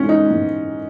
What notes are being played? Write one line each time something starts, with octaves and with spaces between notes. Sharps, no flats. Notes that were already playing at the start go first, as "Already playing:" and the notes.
Already playing: G#2 E3 C#4
D#4
G#2 E3